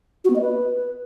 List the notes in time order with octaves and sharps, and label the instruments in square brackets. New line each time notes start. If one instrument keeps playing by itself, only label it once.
[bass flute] F#4
B3
D#5
B4